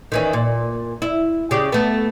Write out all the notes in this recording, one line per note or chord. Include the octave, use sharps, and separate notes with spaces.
D#3 E3 C#4
A#2
E4
C#3 G4
A3 B3